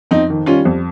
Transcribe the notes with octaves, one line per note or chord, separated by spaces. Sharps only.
F2 C4 D#4
D#3
G3 C#4 F4
F2